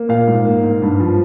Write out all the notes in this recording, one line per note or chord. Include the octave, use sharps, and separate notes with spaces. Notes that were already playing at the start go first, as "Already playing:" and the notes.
Already playing: A#3
A#2 F5
G#2
A#3
G#2
G2
F3